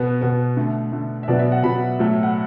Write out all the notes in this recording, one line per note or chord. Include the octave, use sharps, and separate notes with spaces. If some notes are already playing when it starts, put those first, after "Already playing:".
Already playing: B2 B3
B2 B3
D3 A3
D3 A3
E5
B2 F#3 B3 D5
E5
F#5
B2 F#3 B3 B5
A2 F#3 A3
F#5